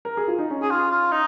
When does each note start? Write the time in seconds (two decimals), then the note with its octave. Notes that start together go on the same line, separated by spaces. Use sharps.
0.05 A#4
0.17 G#4
0.28 F4
0.39 D#4
0.50 C#4
0.63 G#4
0.71 F4
0.91 F4
1.12 D#4